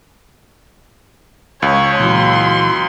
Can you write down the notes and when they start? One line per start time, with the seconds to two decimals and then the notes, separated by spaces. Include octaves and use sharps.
1.62 C#2 C#5
1.99 A#2 E3 F#3 C6